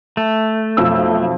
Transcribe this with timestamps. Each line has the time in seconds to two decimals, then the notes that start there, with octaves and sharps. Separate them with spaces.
0.17 A3
0.77 B1 F2 E6